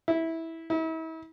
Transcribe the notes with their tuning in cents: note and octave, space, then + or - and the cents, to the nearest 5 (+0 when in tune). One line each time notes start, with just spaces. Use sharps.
E4 -15
E4 -40